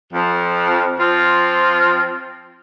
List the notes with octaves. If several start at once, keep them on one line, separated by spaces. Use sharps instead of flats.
F2 F3
F3 C4 F4